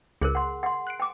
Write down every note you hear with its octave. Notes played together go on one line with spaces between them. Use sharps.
C#2 G#4 A#4 F#6
F#5 C6
F#5 C6
F#6 C7 D7
G5 D6